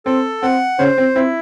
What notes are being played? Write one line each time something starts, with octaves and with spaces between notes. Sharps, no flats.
C4 A4
C4 F#5
C#3 C#4 C5
C4
C4 E4